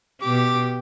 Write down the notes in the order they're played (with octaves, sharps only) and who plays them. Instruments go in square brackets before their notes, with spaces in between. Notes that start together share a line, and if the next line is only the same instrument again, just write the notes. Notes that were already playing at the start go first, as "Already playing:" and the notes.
[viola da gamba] B2 G4 [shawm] D6